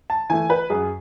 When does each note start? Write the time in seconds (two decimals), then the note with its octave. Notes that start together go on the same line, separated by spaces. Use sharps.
0.10 A5
0.30 E3 A3 G#5
0.50 B4
0.70 F#2 G#4